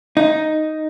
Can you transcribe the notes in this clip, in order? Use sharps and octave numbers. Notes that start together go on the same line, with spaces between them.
D#4